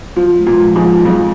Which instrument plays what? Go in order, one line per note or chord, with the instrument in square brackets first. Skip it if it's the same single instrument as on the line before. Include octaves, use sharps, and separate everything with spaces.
[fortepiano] F3 [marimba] F4
[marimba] G#3
[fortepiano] A#2
[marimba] F3
[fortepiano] G#2
[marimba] F4
[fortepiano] F2 [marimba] G#4